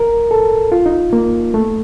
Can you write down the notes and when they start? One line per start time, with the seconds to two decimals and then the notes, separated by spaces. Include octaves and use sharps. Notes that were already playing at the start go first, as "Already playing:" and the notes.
Already playing: A#4
0.31 A4
0.72 F4
0.86 D#4
1.13 A#3
1.54 A3